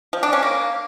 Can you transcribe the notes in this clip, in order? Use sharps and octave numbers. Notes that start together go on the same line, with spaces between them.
F3
D4
C#4
A#3